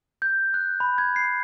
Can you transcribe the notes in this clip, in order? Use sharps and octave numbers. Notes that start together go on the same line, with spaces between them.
G6
F#6
B5
G#6
C7